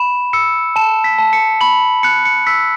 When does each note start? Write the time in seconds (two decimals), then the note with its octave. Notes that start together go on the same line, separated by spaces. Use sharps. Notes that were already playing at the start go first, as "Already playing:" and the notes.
Already playing: B5 E7
0.33 E6 C#7
0.76 A5 E7
1.04 B6
1.19 A5
1.33 C#7
1.61 B5 F#7
2.03 F#6 C#7
2.25 C#7
2.47 E6 B6